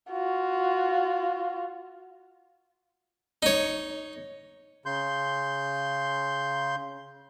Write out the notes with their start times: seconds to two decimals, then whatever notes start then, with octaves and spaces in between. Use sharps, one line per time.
0.11 F4 F#4
3.43 D#4 C#5
4.86 C#3 C6 G6